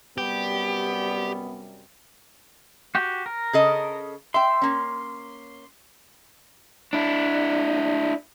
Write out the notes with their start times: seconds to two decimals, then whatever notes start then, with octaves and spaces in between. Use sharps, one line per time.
0.18 F#2 C3 G3 B3 G4
2.95 F#4 G4
3.26 A#4
3.53 C#3 A4 D#5
4.34 E5 G5 C6
4.62 A#3 C#4
6.93 D4 E4